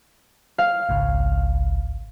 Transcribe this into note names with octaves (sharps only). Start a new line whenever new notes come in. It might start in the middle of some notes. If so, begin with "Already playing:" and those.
F5
G#1 C#2 G#2